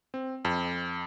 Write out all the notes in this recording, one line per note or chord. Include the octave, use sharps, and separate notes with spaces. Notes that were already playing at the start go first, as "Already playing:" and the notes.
C4
F2